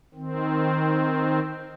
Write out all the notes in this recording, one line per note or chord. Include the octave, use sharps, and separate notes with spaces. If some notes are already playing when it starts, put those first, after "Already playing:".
D#3 C4